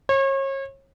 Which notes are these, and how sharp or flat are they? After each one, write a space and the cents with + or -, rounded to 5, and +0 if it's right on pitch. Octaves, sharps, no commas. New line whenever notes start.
C#5 -35